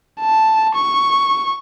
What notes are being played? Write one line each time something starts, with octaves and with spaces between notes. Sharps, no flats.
A5
C#6